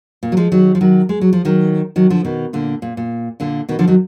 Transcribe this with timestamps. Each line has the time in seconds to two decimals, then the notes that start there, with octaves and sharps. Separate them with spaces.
0.23 A#2
0.32 F#3
0.37 F3 G#3
0.52 D#3 F#3
0.75 F3
0.81 D#3 F#3
1.09 G#3
1.21 F#3
1.33 F3
1.45 D#3 F#3
1.96 D#3 F#3
2.10 D3 F3
2.25 B2 D#3
2.53 A#2 D3
2.82 A#2
2.97 A#2
3.40 A#2 D3
3.69 B2 D#3
3.79 D3 F3
3.88 D#3 F#3